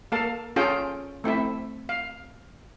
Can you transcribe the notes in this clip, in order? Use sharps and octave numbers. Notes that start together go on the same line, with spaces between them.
A#3 A4 F5 A5
C#4 F4 G#4 A4 F5 G5
A3 C4 E4 E5
F5